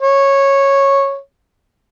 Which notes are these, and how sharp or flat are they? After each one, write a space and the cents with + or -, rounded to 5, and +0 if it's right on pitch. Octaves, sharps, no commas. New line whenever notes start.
C#5 -10